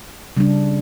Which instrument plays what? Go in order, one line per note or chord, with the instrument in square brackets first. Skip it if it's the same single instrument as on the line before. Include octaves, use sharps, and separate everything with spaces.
[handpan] C#3 G3 D4